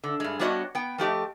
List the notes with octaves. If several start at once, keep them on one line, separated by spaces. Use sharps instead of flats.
D3
G2 G#3
G3 B3 D4 F#4 C#5 D#5
B3 G5
F3 A3 G4 D#5